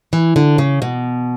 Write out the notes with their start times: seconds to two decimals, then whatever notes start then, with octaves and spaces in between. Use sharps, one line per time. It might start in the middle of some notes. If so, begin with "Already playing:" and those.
0.13 E3
0.36 D3
0.58 C#3
0.82 B2